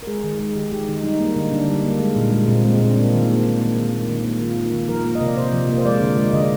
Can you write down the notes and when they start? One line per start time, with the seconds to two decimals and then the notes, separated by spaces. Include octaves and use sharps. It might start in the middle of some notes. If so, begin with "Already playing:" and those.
0.03 A#4
0.07 G#3 G#4
0.24 D#3
0.39 G#3
0.55 D#3 G4
0.72 G#3 G4
0.88 D#3 D#4
1.03 G3 D#4
1.20 A#3
1.36 D3
1.52 D3 D4
1.68 G3
1.84 A#3
1.99 G#3
2.16 A#2
2.32 G#3
2.48 A#2 C4
2.64 G#3 C4
2.80 A#2 C4
2.89 D4
2.96 A#3 C4
3.13 D#3
3.28 A#3
3.44 D#3
3.60 A#3
3.76 D#3
3.93 A#3
4.09 D#3
4.25 A#3
4.41 D#3 F4
4.56 A#3
4.73 D#3
4.89 F3 A#4
5.05 A#3
5.15 D#5
5.21 C3
5.26 D5
5.37 C3 C5
5.53 F3
5.69 A#3
5.78 C5
5.85 G#3 D5
6.01 D3
6.17 G#3
6.33 D3 D#5
6.42 D5